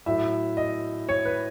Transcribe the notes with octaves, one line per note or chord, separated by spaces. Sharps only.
A2 F#3 E5
D#5
C#5
B4